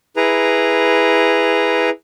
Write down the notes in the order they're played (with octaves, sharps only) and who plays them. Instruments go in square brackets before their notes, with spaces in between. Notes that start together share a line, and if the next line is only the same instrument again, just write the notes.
[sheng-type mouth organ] E4 G#4 B4 A#5